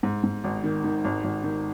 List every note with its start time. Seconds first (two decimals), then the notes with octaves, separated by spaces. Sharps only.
0.03 G#2
0.23 G#2
0.44 G#1
0.64 D#3
0.84 D#3
1.04 G#1
1.24 G#1
1.44 D#3